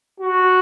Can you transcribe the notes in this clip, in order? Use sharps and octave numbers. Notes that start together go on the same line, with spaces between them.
F#4